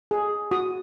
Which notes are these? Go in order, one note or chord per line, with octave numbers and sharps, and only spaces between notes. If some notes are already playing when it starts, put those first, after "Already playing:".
G#4
F#4 D#6